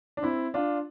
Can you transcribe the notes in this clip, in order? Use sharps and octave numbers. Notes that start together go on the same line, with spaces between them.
D4
C4 E4
D4 F4